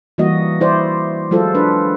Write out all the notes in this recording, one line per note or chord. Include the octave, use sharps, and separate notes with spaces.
E3 G3 A#3 F#4 D#5
E4 C5 D5
F#3 G#3 F4 A4 C5
D4 B4